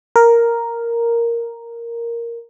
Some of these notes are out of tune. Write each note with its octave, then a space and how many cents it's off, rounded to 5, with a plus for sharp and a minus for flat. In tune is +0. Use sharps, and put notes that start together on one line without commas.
A#4 +0